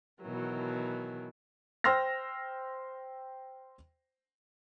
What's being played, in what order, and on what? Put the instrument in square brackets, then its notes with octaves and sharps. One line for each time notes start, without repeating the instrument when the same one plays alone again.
[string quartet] B2 D#3 E3 F#3
[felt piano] C5 G5 C6 E6 F6 A#6